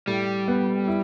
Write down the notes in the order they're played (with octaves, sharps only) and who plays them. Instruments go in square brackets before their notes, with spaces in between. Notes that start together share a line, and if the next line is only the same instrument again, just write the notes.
[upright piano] A2 [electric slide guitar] G3
[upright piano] B3
E4